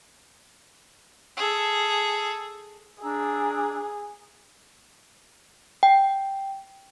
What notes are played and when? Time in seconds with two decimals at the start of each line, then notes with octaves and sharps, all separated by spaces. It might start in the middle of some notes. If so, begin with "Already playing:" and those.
1.37 G#4 A4
3.03 D4 G#4 A#5 E6
5.83 G5